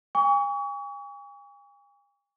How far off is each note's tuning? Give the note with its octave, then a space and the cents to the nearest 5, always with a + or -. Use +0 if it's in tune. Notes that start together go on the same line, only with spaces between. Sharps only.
G#5 -40 C#6 +35